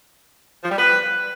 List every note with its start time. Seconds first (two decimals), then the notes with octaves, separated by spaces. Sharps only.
0.64 F3
0.70 G3
0.77 B4